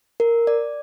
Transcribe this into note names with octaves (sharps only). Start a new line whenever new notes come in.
A#4
D5